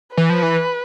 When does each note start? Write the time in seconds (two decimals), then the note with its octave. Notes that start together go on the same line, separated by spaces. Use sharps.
0.17 E3 B4
0.30 F3
0.43 E3